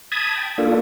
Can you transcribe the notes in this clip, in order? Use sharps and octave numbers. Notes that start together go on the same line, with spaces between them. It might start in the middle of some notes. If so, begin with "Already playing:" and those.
A5 B5 D#6 G#6
G5
A#3 D4 F4 A4